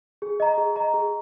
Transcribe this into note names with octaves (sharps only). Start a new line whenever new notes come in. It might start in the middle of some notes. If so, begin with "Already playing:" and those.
G#4
D#5 A#5
G#4
D#5 A#5
G#4